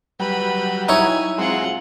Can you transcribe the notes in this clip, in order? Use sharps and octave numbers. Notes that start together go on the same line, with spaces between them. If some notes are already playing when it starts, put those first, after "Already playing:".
F#3 G3 B4 B5
D#4 E4 C#5 G#5
F#3 G#3 C4 F4 F#5